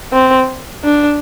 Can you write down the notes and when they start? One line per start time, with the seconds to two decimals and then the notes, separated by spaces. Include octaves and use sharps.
0.12 C4
0.84 D4